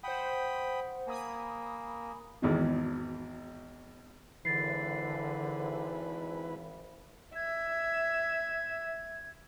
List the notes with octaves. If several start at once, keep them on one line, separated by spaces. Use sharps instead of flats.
C5 F#5 G5 B5 D#6
A#3 G#5 B5 D#6
G#1 E2 B2
G#1 D3 E3 B4 A6 C7
E5 G#6